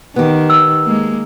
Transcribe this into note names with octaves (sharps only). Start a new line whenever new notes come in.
D#3 B3 G4
E6
G#3 A#3